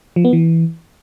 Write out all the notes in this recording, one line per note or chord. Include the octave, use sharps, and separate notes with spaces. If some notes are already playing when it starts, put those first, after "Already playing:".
F3
B3
E3